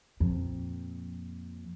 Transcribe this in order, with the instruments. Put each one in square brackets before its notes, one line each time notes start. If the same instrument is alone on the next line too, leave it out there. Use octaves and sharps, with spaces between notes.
[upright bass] F2 A#2